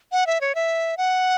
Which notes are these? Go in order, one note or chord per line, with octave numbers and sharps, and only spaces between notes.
F#5
E5
C#5
E5
F#5